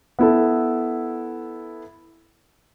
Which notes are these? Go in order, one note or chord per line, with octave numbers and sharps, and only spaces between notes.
B3 E4 A4